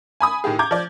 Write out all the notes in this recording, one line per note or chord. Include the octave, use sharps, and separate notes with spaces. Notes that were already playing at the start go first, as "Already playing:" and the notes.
G#5 B5 D#6
A2 D#3 G4 G#4
A#5 D6 G6 G#6
F3 D5